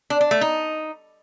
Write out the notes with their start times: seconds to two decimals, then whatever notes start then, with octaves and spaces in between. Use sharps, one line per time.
0.10 D4
0.21 D4
0.31 A3
0.41 D#4